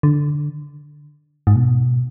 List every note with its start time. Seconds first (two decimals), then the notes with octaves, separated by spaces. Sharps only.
0.03 D3
1.47 G#2
1.55 B2